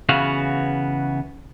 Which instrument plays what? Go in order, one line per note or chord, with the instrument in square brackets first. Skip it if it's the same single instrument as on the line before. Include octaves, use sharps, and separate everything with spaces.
[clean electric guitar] C#3 E3 B3 F#4 F5